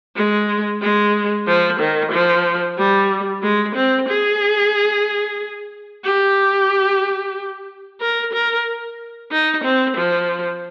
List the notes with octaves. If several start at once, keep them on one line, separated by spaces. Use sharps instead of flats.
G#3
G#3
F3
D#3
F3
G3
G#3
C4
G#4
G4
A#4
A#4
D#4
C4
F3